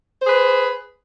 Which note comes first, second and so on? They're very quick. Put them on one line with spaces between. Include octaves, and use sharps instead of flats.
C5 G#4 B4